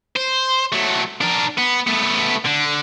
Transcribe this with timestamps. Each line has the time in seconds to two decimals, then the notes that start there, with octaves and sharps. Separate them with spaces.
0.16 C5
0.72 F#3 A3
1.21 D4 A#4
1.58 B3
1.87 A3 B3
2.45 D3